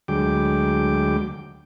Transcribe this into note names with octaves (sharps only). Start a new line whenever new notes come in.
D2 F#3 G#3 G5 D6